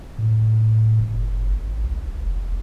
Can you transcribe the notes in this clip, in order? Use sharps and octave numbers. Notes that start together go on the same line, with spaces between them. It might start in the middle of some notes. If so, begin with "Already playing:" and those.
A2
F#1
G#1
C2
F1